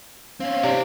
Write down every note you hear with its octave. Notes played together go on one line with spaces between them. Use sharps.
C4 C#4 F5
C3 D#4 D5